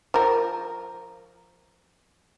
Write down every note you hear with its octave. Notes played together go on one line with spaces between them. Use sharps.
F3 A#4